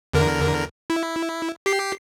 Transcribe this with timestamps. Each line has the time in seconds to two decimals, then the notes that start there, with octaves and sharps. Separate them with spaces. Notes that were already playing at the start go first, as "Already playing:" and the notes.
0.13 E2 D3 A#4
0.90 E4
1.66 G4 C7